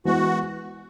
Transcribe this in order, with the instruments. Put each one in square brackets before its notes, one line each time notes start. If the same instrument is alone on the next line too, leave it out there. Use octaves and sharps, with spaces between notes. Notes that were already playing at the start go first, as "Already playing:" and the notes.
[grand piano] E3 G#3 B3 E4 B4 [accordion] F#4